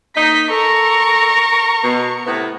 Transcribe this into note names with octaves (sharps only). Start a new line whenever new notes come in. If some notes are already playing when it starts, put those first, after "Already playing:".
A#3 D#4 B6
A4 A#4 C#6
B2
A2 C3 B3